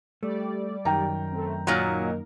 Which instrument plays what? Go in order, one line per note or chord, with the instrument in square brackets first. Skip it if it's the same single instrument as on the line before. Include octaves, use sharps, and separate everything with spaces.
[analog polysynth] G3 D5 [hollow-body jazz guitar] A3
[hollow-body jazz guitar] F#2 D#3 [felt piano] G5 A#5
[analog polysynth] A3 C4
[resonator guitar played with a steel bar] A#2 F#3 [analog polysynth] A#3 D#4 A#4